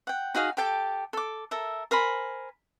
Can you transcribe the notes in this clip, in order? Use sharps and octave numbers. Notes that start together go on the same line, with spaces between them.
F#5 G5
D#4 F#4 G#4 F5
G4 A4 G5 A5
A4 D6
A4 A#4 E5
A#4 C5 G#5 B5